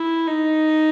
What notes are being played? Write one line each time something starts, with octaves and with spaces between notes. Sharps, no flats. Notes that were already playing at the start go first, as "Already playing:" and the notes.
Already playing: E4
D#4